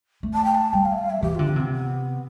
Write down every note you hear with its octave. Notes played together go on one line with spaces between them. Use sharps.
A3
A5
G5
A5
G3 G5
F5
E5
F5
E5
E3 G4
D3 F4
C4
C3 B3
B3